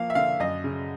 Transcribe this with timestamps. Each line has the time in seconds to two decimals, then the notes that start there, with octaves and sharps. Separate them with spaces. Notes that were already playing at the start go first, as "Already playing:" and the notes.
Already playing: F3 A#3 F5
0.10 E5
0.15 D3 F5
0.40 F#2 D#5
0.64 C#3